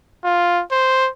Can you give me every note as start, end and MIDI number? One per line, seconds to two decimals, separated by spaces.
0.25 0.63 65
0.71 1.09 72